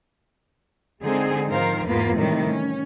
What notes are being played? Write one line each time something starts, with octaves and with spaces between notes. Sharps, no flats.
D3 G#3 C4 D#4 G#4
G#2 D#3 F3 A#4 C5 F5
E2 G#2 A#3 B3 F4 B4
A2 C3 D#3 E3 G3 G#3
C#4